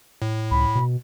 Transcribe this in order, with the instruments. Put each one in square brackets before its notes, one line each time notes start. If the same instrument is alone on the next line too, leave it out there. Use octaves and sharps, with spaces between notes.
[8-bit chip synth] A2
[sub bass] C#2 [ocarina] B5
[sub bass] B2